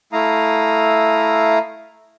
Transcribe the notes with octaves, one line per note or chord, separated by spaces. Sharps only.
A3 E4 F5 A#5 D#6